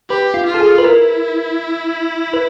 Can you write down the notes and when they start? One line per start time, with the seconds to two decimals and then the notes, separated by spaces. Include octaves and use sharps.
0.10 G4 B4
0.34 F4
0.47 F4
0.54 A4
0.60 G#4
0.78 B4
0.84 E4 A#4
2.33 B4